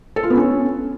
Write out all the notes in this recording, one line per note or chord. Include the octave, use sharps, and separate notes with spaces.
A4
F4
B3
C#4